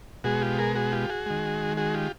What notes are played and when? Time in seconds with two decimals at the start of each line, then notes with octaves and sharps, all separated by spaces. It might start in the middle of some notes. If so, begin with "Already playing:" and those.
0.24 B2 G#3 F#4 G#4
0.42 F4 G4
0.58 G#4 A#4
0.75 F#4 G#4
0.92 F4 G4
1.09 F#4 G#4
1.26 D#3 G#3
1.77 F#4 G#4
1.94 F4 G4